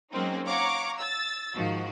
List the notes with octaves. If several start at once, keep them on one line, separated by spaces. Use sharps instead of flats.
F#3 G#3 A#3 C4 C#4 D#4
C#5 F5 F#5 A#5 C#6 D6
E6 A6
G#2 D#3 F3 F#4